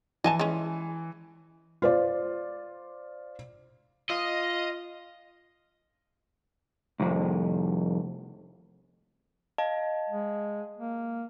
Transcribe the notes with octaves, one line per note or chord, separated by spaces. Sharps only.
E3 D#5 G#5 A5
G#3 C#4
F4 C5 D5
F4 D#5
C2 F2
D#5 F5 A5
G#3
A#3